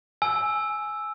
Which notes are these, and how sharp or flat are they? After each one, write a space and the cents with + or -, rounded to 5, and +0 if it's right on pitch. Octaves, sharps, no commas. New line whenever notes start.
G#5 +15 E6 +0